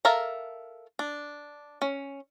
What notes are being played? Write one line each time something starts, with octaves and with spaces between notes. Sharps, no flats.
A4 A#4 E5 F5 A#5
D4
C#4